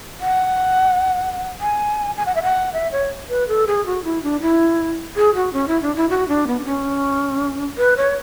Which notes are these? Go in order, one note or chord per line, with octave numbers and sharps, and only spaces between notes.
F#5
G#5
G#5
F#5
E5
F#5
E5
C#5
B4
A4
G#4
F#4
E4
D4
E4
G#4
F#4
C#4
E4
D4
E4
F#4
D4
B3
D4
C#4
B4
C#5